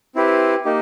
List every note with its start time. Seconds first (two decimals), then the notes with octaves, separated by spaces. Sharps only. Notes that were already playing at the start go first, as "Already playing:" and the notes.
0.15 C4 E4 G4 B4
0.65 A#3 D#4 G4